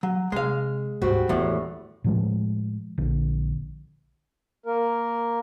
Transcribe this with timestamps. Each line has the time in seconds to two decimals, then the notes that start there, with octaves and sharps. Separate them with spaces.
0.03 F#3
0.32 C3 G#3 F5
1.02 D2 G#2 G3 C4 F#4
1.29 E2 A2 D#3 A#3
2.04 A2 F3 G#3
2.98 A#1 D3
4.66 A#3 A#4